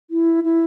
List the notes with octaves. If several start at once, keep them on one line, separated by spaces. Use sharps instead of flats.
E4
E4